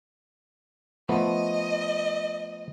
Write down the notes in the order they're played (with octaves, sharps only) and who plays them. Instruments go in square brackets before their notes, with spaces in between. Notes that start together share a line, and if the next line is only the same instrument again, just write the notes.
[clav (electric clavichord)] F3 A3 B3 [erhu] D#5